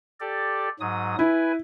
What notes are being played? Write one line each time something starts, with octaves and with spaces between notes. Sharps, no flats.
G4 A4 D5
G#2 F#3 D#6
E4 B4 G#5